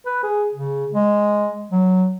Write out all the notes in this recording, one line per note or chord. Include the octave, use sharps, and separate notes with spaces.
B4
G#4
C#3
G#3
F#3